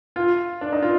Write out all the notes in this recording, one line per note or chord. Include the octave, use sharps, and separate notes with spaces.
F4
D4
D#4
F4